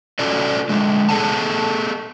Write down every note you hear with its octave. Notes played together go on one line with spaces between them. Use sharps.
C#4 F4 F#4 A4 D5
D3 G#3
B3 G#4 A4 F#5 A5